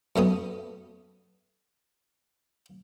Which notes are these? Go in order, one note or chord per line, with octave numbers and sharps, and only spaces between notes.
F#2 A3 B3 D#6